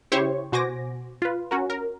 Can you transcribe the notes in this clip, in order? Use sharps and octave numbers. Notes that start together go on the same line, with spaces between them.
C#3 E4 G4 C5 C#5 C#6
B2 F#4 C5 G#5 D6 A#6
F4 B4
C#4 F#4 A#4
A#4